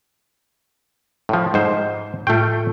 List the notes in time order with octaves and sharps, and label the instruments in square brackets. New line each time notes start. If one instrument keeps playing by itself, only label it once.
[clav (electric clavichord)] A2 F3
G#2 C5
[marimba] A2 F4 [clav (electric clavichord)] A3 G5